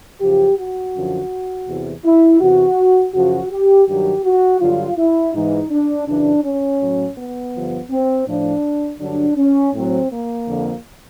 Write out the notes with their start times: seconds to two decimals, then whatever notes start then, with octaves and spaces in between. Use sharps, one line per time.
0.20 F#2 C#3 F3 G4
0.57 F#4
0.94 F#2 D3 F3
1.67 E2 C3 E3
2.04 E4
2.41 E2 C3 E3 F#4
3.14 F#2 C#3 F3 F#4
3.51 G4
3.87 G2 D#3 F#3 G4
4.24 F#4
4.60 G2 D3 F#3 F4
4.98 E4
5.34 G#2 E3 D#4
5.71 D4
6.07 F#2 C#3 E3 D4
6.44 C#4
6.81 A2 F#3
7.17 B3
7.54 G2 D3 F3
7.91 C4
8.27 A2 F3 D4
9.00 G2 D3 F#3 D4
9.37 C#4
9.74 A2 F#3 C4
10.11 A#3
10.47 F2 D3 F3